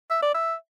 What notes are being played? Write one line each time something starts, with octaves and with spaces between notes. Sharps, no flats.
E5
D5
E5